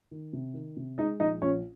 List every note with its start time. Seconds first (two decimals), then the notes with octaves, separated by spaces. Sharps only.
0.11 D#3
0.33 C3
0.54 D#3
0.77 C3
0.98 G#3 D#4 D#5
1.20 A#1 D#4 D#5
1.42 A#1 C#4 C#5